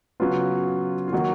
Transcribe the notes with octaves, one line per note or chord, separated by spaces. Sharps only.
C#3 F#3 B3 F4
F4
D#3 F#3 A#3 F#4